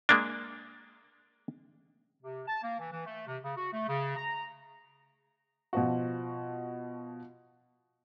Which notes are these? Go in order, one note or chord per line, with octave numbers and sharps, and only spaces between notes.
G#3 A#3 D4
C3
A5
A#3
E3
E3
A3
C3
C#3
F#4
A3
C#3
A#5
B2 F3 F#4